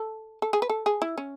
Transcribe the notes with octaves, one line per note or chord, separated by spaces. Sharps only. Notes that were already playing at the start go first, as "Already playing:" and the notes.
Already playing: A4
A4
G#4
B4
A4
G#4
E4
C#4